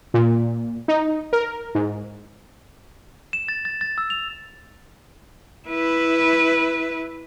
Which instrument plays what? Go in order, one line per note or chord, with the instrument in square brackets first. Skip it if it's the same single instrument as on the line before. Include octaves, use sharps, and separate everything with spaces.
[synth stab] A#2
D#4
A#4
G#2
[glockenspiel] E7
A6
A6
A6
E6
F7
[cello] E4 B4